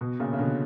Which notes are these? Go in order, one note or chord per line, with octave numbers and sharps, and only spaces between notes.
B2
A#2 C#3
C#3
B2 D3